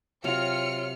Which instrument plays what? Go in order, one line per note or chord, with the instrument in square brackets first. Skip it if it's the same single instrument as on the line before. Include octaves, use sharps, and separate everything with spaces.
[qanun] C3 F#3 [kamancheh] F4 [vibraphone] C#5 [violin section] F6 C#7